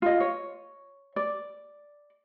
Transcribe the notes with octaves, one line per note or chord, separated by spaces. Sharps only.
F4 D#5
C#5
D5